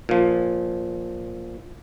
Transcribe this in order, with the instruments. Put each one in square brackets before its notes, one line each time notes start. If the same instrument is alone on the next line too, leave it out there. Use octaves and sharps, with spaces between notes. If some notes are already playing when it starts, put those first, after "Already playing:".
[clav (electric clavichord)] A#2 F3